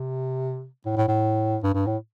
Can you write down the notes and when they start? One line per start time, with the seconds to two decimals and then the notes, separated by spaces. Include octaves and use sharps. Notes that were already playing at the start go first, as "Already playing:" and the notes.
Already playing: C3
0.86 A2
0.97 A2
1.08 A2
1.63 G2
1.74 G2
1.87 A2